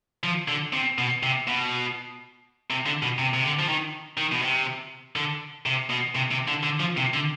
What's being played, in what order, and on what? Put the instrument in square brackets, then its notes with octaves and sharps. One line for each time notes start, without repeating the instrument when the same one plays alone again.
[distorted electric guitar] F3
D3
C3
B2
C3
B2
C3
D3
B2
C3
C3
D3
F3
D#3
D#3
B2
C3
D3
C3
B2
C3
C3
D3
D3
F3
C3
D3